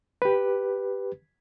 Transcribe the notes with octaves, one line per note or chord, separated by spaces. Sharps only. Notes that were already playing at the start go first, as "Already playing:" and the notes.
G4 B4